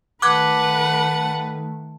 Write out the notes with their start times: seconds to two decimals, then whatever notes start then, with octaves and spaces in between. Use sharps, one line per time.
0.22 D#3 A3 B4 F#5 A5 D6 F#6 G#6